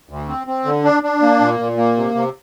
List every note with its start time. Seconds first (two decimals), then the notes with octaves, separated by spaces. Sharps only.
0.09 D2
0.28 C4
0.47 C4
0.65 D3
0.84 D4
1.03 D4
1.22 A#3
1.41 A#2
1.59 A#2
1.77 A#3
1.97 C3
2.15 C3